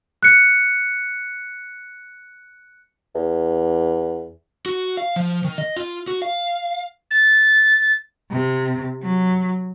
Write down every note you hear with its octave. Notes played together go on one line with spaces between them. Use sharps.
F#6 C#7
E2
F#4
F5
F3
D#3
D#5
F4
F#4
F5
A6
C3
F#3